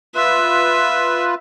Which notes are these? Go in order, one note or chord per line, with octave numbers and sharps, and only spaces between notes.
F4 B4 E5